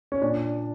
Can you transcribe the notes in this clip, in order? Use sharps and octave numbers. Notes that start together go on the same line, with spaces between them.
C#4
A#2 D4